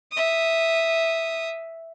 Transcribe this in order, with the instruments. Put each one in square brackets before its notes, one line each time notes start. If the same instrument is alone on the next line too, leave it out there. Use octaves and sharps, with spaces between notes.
[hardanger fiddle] E5 D#6